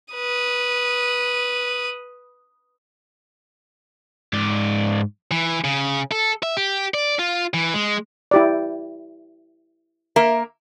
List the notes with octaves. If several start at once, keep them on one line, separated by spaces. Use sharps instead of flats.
B4 D#6
G#2 D5
E3
C#3
A4
E5
G4
D5
F4
E3
G#3
E4 G4 D5
A#3 A#4 E5